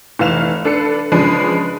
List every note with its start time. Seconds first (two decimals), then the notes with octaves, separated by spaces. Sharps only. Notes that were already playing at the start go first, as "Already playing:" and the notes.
0.19 F1 E3 F5 E7 F7
0.65 D4 A4 B4 C7 C#7
1.12 C#3 F3 G#3 D4 B4